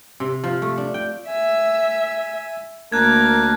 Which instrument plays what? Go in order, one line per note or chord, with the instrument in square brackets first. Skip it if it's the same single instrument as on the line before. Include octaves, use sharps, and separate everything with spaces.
[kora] C3
F3
A3
D4
G5
[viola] E5 [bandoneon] G#5
[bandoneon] D2 D4 A#4 [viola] A#3 [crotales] F#6 G#6